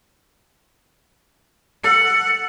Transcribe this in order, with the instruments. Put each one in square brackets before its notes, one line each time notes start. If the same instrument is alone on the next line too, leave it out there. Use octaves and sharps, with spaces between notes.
[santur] A4 [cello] F#5